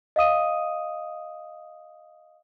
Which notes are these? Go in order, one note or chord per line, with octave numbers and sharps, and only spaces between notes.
D#5 F5 D#6 D#7